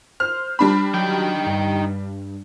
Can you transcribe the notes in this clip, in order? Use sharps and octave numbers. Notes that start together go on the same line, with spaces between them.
C5 F6
G3 D4 B5
F#3 D#4 G5
G2